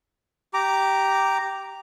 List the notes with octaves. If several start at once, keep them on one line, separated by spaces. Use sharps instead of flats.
G4 A#5 D6